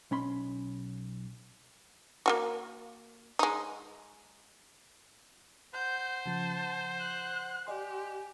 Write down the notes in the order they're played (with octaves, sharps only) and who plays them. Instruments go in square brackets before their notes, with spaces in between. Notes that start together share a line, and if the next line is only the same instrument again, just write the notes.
[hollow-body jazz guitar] B1 C#4 B5 C6
[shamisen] A#3 F4 F#4
G#3 D#4
[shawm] C5 [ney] F#5 [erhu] G6
[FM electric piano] C#3 F3 [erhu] A5
[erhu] F#6
[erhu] G4 [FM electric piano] D5 D#5 C6 [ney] G#5